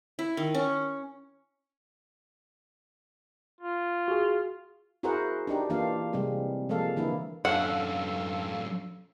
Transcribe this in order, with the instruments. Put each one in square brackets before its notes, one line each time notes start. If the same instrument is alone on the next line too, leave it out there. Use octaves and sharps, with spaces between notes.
[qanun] E4
D#3
C#4
[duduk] F4
[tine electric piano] F#4 G#4
[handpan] E4 F#4 G#4 A#4 C5 F#5
D4 D#4 G4
E3 A#3 D4 F4 F5
C3 G3 G#3 C4
F3 G#3 A#3 A4 F5
D3 E3 A#3 E4
[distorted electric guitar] F#2 D4 [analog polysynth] A4 F5 E6 [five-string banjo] F#5